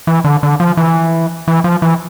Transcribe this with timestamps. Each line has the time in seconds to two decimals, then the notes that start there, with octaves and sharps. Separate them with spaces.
0.07 E3
0.24 D3
0.43 D3
0.60 F3
0.77 E3
1.48 E3
1.64 F3
1.82 E3